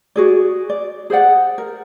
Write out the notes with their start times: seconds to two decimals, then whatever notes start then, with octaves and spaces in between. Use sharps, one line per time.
0.16 F#4 G#4 D5
0.70 D5
1.10 G#4 C5 D5 F#5
1.58 A#4